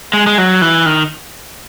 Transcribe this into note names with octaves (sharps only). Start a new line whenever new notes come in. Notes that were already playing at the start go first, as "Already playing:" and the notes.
G#3
G#3
F#3
E3
D#3